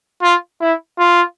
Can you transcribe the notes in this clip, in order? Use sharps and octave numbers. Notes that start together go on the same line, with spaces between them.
F4
E4
F4